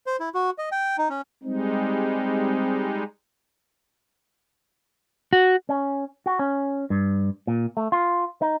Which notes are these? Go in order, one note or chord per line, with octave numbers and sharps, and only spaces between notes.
C5
E4
F#4
D#5
G5
D#4
C#4
G3 G#3 C4 D#4
F#4
C#4
F#4
C#4
G2
A#2
A3
F4
D#4